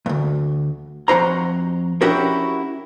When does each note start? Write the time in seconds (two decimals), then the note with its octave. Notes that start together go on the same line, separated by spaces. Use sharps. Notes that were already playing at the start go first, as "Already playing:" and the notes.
0.06 D2 G2
1.08 F2 D#3 F#4 C5 A#5
2.01 C#4 D4 E4 F#4 G4 A#4